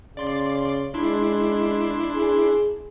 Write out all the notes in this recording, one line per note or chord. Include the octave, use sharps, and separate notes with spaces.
C#3 D5 C6 A6
G#3 D4 E4 C6
G#4